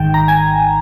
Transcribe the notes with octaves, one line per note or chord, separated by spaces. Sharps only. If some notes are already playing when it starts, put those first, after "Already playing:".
Already playing: G#1 G#2 D#3 G5
A#5
G#5